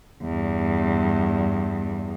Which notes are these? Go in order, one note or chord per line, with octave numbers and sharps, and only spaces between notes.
E2 G2